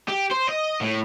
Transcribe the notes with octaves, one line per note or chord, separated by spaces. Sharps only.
G4
C5
D#5
A2